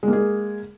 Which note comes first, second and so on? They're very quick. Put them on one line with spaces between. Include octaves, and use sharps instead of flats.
G#3 A#3 G#4